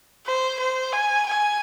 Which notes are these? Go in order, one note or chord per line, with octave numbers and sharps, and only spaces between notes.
C5
C5
G#5
G#5